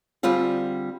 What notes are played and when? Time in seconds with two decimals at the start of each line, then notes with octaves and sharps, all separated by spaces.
0.23 D3 G3 C4 F4 G#4